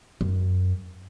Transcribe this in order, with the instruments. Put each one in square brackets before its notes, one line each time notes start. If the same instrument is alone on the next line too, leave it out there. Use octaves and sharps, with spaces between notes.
[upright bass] F#2